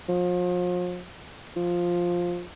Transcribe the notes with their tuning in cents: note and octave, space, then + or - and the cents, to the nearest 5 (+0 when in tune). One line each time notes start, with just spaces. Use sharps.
F3 +40
F3 +5